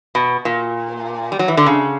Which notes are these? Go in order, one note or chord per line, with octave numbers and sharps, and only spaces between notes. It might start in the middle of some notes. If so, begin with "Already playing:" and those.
B2
A#2
G3
F#3
E3
D3
C#3